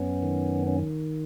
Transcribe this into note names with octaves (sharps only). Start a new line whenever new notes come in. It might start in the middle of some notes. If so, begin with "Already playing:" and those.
Already playing: F#2 B3 C#4
D#3
C#4